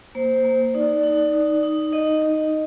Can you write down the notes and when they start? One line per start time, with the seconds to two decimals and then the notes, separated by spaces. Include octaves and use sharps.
0.15 A#3 C5
0.45 A#3
0.74 D#4 D5
1.03 D#4
1.33 D#4
1.63 D#4
1.92 D#4 D#5
2.22 D#4